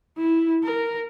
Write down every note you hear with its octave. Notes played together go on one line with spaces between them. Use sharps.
E4
A#4